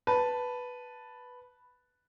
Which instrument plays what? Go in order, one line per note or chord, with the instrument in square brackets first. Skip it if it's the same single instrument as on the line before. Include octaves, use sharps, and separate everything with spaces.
[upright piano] B4 A5